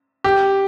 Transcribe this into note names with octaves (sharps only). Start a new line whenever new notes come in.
G4